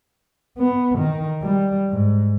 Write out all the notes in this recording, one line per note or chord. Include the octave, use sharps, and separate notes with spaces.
B3
D#3
G3
G#2